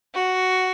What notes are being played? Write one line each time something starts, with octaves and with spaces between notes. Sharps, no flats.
F#4